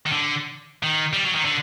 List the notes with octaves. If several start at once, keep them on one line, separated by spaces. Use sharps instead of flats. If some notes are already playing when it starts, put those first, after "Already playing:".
D#3
D3
D#3
G3
F#3
D#3
D3